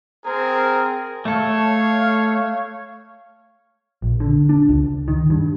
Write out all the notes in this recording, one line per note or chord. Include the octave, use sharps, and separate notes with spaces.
C4 G#4 A#4
A3 A4 C#5 F5
A#1
D3
D4
C#2
D#3
G2